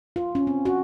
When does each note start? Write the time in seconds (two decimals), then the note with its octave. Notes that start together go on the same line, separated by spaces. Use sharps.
0.16 F4
0.35 C#4
0.47 C4
0.65 F#4